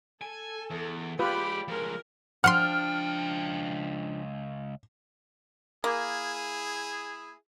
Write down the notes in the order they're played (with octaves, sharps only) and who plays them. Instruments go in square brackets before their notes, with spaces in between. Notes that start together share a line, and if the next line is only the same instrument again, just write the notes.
[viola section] A4 [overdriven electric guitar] G#5
[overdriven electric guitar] E2
[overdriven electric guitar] G#3 D5 [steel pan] F4 B4 [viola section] G4 B5
[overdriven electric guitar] F3 G#3 [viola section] A#4
[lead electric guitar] C#2 G5 [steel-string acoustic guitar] F3 D4 [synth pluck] F#5 C6 [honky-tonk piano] F6
[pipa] A#3 [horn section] E4 G#4